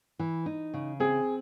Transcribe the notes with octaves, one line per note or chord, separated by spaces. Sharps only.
E3
D#4
C#3
C4 G#4